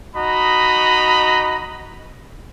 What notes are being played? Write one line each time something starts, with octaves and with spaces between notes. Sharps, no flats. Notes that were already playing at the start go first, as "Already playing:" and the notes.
D#4 F#4 D#5 A#5 B5